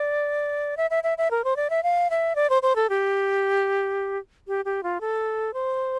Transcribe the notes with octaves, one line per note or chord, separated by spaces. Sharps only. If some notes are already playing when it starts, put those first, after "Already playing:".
Already playing: D5
E5
E5
E5
E5
A#4
C5
D5
E5
F5
E5
D5
C5
C5
A4
G4
G4
G4
F4
A4
C5